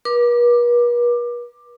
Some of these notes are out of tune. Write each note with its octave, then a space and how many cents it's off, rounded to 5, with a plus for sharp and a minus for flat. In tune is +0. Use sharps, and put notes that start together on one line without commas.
B4 -45 D6 +15